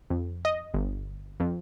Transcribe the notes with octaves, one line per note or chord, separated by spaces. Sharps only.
F2
D#5
G1
F2